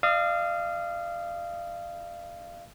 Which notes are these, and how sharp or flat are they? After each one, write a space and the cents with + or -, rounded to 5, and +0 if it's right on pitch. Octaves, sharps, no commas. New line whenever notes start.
D5 +45 F5 -20 D#6 +10